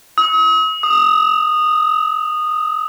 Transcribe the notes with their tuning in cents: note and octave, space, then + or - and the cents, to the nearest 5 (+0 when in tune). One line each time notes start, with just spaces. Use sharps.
D#6 +45
D#6 -15